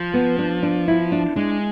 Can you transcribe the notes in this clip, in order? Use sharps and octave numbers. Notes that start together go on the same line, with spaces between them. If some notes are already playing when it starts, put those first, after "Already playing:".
Already playing: F3
B3
D4
D4
E4
D4
G#3 D4